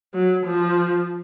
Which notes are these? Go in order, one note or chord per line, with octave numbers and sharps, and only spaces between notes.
F#3
F3